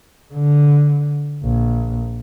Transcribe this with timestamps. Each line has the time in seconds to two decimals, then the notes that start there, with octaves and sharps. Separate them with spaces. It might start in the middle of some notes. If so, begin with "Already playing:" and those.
0.34 D3
1.44 A#1